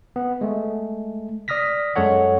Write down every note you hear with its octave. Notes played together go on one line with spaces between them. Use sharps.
B3
G#3 A3
D5 D#6 F6 A#6 B6
F#2 G#3 A4 C#5 F#5